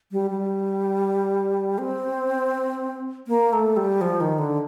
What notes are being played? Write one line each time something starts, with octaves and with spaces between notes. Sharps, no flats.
G3
G3
C4
A#3
A3
G3
F3
D#3
D3